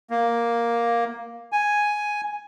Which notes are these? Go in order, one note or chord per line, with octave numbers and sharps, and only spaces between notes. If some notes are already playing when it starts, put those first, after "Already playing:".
A#3
G#5